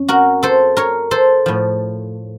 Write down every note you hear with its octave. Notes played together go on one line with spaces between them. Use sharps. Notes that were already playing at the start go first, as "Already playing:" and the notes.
Already playing: F2 C#4
F#4 A#4
A4 C5
A#4 C#5
A4 C5
A2 F3